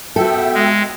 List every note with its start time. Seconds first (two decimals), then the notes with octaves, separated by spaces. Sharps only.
0.16 B3 F#4 A4 E5 G5
0.54 G#3